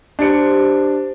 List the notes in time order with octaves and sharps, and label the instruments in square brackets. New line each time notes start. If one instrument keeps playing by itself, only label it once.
[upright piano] D4 C#7 [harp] D#4 G4 C5